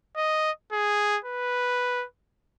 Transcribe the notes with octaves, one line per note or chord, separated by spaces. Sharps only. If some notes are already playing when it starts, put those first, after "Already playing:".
D#5
G#4
B4